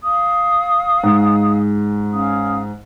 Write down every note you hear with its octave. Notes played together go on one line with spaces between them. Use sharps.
F5 D#6
G#2 G#3
C#4 F5 D#6